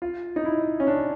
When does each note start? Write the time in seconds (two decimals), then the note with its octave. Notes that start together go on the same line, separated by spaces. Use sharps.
0.02 F4
0.36 D#4
0.45 E4
0.80 C#4
0.87 D4